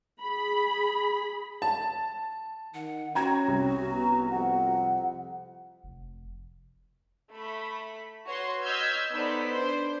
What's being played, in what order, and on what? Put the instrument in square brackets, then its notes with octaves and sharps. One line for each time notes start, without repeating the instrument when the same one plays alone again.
[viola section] G#4 B5
[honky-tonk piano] A5
[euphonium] D#3 [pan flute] F#5
[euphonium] C#4 [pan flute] F#4 [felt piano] G5 A#5 G#6
[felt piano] C2
[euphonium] B3 [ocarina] A#5
[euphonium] F2 [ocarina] F#5
[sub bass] F1
[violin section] A3 B5
F#4 B4 C#5 C6
D#5 E6 F6 G6 G#6 B6
B3 D#4 A4 C5 D5 B5
D4 C5